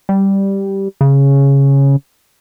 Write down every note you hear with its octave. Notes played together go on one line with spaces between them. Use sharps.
G3
C#3